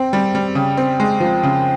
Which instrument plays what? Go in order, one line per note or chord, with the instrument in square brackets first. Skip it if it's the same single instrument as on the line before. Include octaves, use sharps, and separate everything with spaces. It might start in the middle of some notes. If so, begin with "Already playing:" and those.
Already playing: [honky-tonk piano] C4 [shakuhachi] G5
[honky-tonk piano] G3
G3
[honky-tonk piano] C#3 [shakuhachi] G5
[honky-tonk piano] C4
G#3
F3
C#3